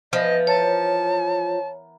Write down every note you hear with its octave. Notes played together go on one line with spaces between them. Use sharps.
E3 F3 B3 D#5 A5
A#4 C#5 A5